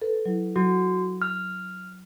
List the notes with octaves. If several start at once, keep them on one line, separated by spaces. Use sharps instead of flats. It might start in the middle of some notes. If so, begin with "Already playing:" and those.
A4 B4
F#3 E4
F#3 F#4
F6